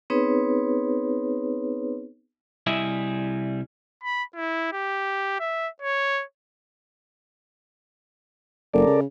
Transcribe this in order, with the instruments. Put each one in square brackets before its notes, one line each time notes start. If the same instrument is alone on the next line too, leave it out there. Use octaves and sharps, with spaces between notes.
[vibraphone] B3 C4 D#4 G#4 B4 C#5
[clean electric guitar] C2 G3 E4 G#4 D#5 E5
[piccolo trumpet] B5
E4
G4
E5
C#5
[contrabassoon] F#1 [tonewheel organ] A4 A#4 D5
[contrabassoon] C#3